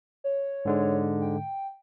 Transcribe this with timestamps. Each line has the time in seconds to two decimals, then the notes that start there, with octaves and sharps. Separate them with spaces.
0.24 C#5
0.65 G#2 D3 G#3
1.21 G5